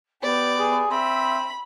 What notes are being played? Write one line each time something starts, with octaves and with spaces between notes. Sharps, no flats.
B3 G4 D5
G#4
C4 E5 B5